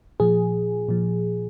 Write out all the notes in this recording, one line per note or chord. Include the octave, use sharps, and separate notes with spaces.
A#2 F3 G#4
A#2 F3